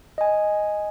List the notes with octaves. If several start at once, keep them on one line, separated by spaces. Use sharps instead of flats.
D#5 G#5